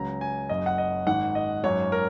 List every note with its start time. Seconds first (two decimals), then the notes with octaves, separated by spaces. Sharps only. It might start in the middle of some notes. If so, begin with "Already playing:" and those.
Already playing: C#2 C#3 F#3 A#5
0.21 G#5
0.49 F#1 F#2 F#3 D#5
0.66 F#5
0.78 D#5
1.06 G#1 G#2 D#3 F#5
1.35 D#5
1.63 G#1 F#2 F#3 C#5
1.92 A#4